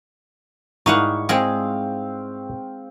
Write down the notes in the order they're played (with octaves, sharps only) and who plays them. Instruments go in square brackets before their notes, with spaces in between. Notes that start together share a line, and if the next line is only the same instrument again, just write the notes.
[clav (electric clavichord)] G#2 G3 E4 [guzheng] D#4 F5 F#5 [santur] C#6
[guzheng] G#3 G#4 [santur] C4 F5